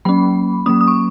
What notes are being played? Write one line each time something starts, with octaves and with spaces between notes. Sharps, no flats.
F#3 A#3 C#4 B5
F#3 A#3 C#4 D#6
D#6
C#6